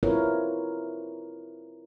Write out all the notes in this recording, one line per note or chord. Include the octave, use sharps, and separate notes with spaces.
C4 E4 F4 A#4 B4 C#5